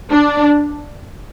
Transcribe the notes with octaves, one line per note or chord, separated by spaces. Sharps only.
D4